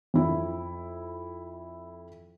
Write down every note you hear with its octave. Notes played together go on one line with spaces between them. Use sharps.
F2 E4